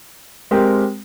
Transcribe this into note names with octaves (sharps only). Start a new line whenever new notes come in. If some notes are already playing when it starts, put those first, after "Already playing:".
G#3 C4 G4 A#4